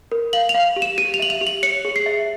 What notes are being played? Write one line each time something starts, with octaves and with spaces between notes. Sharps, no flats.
A#4
F5 F#7
F7
F5
G4
E7
G4 D#7
F7
E5 F#7
F7
G4
F#7
C#5 C#7
G#4
C7
E5